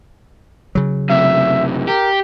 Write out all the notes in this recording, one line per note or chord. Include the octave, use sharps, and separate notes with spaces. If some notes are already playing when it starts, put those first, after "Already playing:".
C#3 F#3
F#2 C3 E5
G4 A#4